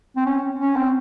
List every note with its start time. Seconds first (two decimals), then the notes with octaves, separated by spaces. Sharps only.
0.16 C4
0.26 C#4
0.59 C#4
0.76 C4